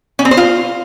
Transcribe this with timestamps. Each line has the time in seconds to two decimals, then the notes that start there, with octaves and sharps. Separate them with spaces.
0.19 C#4
0.25 C4
0.31 C5
0.37 F4